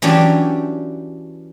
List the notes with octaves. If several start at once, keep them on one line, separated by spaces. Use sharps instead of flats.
E3 F#3 C#4 D4 G4